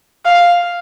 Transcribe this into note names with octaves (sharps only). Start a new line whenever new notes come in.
F5